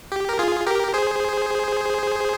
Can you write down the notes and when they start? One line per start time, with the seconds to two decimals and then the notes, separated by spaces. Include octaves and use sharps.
0.12 G4
0.29 A#4
0.39 F4 G#4
0.66 G4 A#4
0.94 G#4 C5